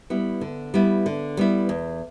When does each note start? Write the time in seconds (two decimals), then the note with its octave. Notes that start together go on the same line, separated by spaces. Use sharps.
0.10 G3 B3 E4
0.41 D3
0.74 G3 B3 E4
1.06 D3
1.37 G3 B3 E4
1.69 E2